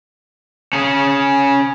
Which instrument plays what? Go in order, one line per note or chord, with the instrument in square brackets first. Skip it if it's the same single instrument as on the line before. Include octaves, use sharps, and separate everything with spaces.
[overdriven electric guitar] C#4 G#4